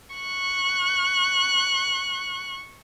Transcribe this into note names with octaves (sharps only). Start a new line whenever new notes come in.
C#6 F#6